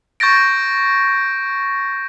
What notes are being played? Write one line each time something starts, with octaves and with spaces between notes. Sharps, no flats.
C#6 G6 A6 A#6 D7